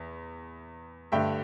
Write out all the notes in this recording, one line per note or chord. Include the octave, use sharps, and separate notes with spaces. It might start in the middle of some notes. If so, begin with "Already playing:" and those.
Already playing: E2
G2 D3 A3 E5 G5